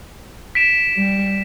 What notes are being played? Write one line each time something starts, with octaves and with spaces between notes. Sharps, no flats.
B6 D7 E7
G3